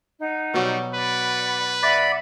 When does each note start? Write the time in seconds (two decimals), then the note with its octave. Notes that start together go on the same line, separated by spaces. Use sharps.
0.18 D#4 F#5
0.54 B2 F#3 G3
0.94 B4 D5 F#5 B5
1.83 D5 E5 F#5 B5